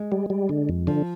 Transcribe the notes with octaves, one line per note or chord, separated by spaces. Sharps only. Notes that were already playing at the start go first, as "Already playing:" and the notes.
Already playing: G#3
G3
G3
D3
F2
D3 F3